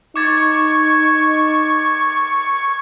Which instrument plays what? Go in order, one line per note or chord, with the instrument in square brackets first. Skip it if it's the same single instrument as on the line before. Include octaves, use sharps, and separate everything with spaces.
[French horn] D#4 [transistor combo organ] C#6 [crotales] D6 G#6 A6